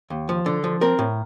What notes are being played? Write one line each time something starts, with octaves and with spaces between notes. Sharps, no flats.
D#2
F3
D3
F3
C4 A#4
A2